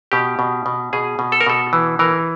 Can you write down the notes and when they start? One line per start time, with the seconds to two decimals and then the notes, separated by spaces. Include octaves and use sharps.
0.12 B2 G4
0.39 B2
0.66 B2
0.93 B2 G#4
1.19 B2
1.32 A4
1.41 A#4
1.47 B2 A4
1.73 E3
1.99 E3 A#4